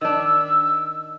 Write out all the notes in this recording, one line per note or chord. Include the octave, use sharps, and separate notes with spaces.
D#3 D4 E6